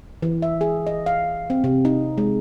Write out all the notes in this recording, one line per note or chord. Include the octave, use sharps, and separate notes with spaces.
E3
E5
G#4
D#5
F5
C4
C3
D#4
G#3